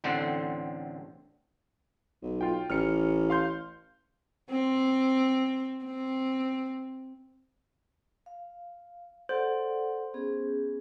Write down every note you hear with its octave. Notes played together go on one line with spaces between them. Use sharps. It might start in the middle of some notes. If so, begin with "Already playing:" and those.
A1 A2 D3 C4 C5 F#5
B1
F4 G5
A1 F6 C#7
F5 C6 G6
C4
C4
F5
A4 C5 D5 F#5
B3 C#4 G#4